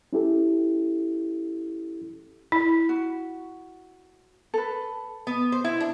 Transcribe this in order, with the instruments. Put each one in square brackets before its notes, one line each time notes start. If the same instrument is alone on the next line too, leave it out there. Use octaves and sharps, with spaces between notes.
[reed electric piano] C#4 E4 G4 A4
[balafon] E4
[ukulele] F#4
A4 B4
[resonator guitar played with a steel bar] B3
C5
E4
D4